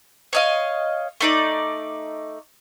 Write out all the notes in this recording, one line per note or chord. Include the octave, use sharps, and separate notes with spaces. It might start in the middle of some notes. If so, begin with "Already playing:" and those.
C#5 D#5 F5
A3 D#4 D5